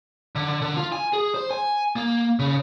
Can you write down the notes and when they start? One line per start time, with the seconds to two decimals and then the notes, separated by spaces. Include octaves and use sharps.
0.36 D3
0.62 D3
0.77 F4
0.92 G#5
1.13 G#4
1.34 C5
1.51 G#5
1.96 A#3
2.39 C#3